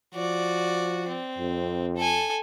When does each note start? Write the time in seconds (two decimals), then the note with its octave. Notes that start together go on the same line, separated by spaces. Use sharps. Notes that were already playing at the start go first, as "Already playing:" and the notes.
0.15 F3 F#4 D5
1.09 C4
1.39 F2
1.97 A4 G#5